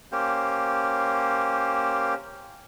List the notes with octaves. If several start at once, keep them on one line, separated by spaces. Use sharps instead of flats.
A#3 C#4 G4 C5